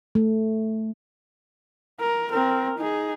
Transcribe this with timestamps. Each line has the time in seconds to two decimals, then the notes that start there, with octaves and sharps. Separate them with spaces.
0.15 A3
2.00 A#4
2.32 C4 A#4
2.79 D#4 G#4